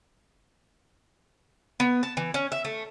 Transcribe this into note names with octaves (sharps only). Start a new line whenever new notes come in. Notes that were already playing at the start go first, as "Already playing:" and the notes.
B3
A5
E3
C#4
E5
A3